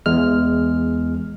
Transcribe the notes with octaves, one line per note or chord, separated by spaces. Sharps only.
E2 G#3 F6